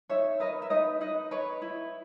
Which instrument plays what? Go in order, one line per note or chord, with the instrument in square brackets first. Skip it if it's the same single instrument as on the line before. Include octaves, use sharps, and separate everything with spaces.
[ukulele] D#4 C#5 E5
A#4 B4 D#5
E5
D#4 B4 D#5
D#4 B4 D#5
B4 C#5
E4